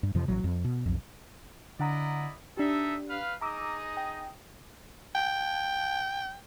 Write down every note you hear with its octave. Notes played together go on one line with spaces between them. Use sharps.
G2
F2 C3 F3
A1 F#3
F2
B2
B1 F2
D3 E4 D5 D#5 F#5 A#5
D4 D#4 G4 A4 E5
B4 F5
D#4 G#4 D#5 A#5 D6 E6
G5
G5